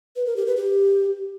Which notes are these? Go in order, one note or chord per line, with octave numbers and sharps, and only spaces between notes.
B4
A#4
G4
B4
G4